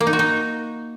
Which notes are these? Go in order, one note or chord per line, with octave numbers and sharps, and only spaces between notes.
A#3
D#4
F#4
D#4